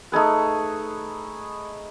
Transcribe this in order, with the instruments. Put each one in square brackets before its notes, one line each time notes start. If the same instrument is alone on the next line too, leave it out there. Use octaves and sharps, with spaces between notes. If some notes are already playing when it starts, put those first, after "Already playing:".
[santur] A3 D#4 G#4 B4